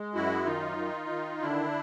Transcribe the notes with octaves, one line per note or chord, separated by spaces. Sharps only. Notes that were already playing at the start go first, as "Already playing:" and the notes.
Already playing: G#3
F#2 E4 F#4
D#3 D#4 F4
D#3
D#3
D3 D4 E4